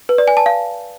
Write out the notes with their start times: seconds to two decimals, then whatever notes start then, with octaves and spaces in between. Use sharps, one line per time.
0.09 B4
0.18 D5
0.28 G#5
0.37 A5
0.46 F5